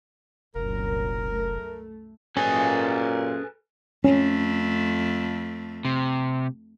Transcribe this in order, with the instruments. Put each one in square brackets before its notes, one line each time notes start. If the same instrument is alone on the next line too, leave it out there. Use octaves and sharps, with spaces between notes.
[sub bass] F1 [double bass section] C2 F#2 A#2 [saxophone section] A#4
[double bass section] A3
[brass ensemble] F#2 A#2 [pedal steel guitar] C#4 G#4 D#5 [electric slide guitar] A4 B4 G#5
[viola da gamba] F2 A3 [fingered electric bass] C#4
[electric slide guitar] C3